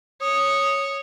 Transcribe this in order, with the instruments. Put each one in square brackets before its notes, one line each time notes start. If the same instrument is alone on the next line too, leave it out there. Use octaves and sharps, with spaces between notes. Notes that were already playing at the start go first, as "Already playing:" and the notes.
[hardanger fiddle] C#5 [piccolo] D#6